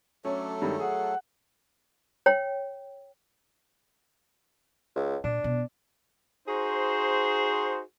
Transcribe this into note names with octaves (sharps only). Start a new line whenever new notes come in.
F#3 A3 C#4 D4 A4
G2 D#3 G#3
G#4 F#5
C#5 G5
C#2
A#2 D4
B2
D#4 F#4 G#4 C5